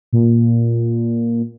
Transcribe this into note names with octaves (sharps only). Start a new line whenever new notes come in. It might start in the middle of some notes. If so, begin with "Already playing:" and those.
A#2